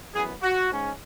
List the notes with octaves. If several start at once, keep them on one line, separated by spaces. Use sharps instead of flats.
F#2 E3 B3 G#4
F#4
G#2 G#3 C#4